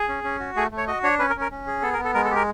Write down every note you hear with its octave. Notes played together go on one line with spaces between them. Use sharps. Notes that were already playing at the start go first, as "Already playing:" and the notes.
Already playing: G#4
C#4
C#4
F#4
A3 G#4
A3
C#5
F#4 D#5
D4 C#5
C#4 B4
A#4
C#4
A#4
C#4
G#4
B3 A4
A#4
B3
A4
G#3 A#4
A4
G4 A#4